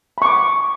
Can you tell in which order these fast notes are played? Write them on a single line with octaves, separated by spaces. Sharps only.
B5 C#6 D6